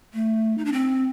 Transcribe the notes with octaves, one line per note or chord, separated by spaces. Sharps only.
A3
D#4
D4
C4